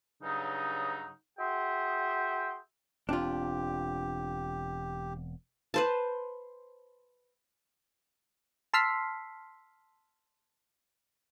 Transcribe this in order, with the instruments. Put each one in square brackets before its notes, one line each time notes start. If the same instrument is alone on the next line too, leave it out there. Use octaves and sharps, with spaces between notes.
[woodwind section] G2 C#3 F#3 D#4
F#4 G#4 E5 G5 C6
[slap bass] E1 C4 [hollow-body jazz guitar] D4 F4 [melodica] G4
[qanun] B4 C5 A5
[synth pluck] A5 C6 E6 F6 B6 C7